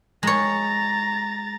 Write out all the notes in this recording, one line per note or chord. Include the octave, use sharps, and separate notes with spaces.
G#3 C#5 A#5 A6